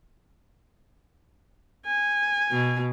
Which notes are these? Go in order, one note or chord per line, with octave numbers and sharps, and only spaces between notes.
G#5
B2